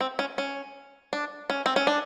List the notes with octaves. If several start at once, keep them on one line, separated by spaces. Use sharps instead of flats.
C4
C#4
C#4
D4
C#4
C4
C#4
D4